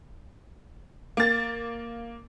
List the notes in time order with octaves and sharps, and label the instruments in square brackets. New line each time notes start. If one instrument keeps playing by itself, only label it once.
[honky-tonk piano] A#3 A6